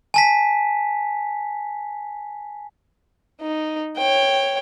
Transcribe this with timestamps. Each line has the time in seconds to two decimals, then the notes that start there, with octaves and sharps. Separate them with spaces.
0.14 G#5 A5 B6
3.41 D#4
3.97 C#5 G5